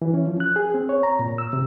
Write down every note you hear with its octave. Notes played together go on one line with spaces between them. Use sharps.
E3
C#4
F3
F#6
G#4
C4
C#5
A#5
A#2
E6
C3